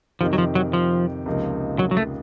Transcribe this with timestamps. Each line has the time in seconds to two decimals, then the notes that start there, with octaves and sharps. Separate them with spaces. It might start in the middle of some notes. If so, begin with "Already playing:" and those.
0.21 F2 C3 D#3 F3
0.33 F#3
0.38 F3
0.55 F#3
0.73 F3
1.26 C#2 C3 F3 A#3 D#4
1.79 F#3
1.91 F#3
1.97 A3